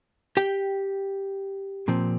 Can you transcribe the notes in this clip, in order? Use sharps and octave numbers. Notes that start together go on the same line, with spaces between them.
G4 G5
A#2 F3 C4